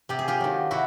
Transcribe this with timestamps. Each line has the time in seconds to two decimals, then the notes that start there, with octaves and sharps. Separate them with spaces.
0.09 C3 G4
0.19 G#4
0.28 F4 G4
0.40 D#3 F#3
0.71 C3 E4 F#4